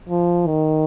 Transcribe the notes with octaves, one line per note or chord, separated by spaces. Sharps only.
F3
D#3